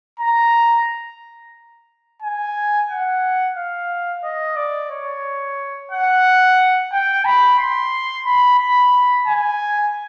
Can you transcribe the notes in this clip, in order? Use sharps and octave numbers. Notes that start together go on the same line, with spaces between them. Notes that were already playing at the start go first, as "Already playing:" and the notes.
A#5
G#5
F#5
F5
D#5
D5
C#5
F#5
G5
B5
C6
B5
B5
G#5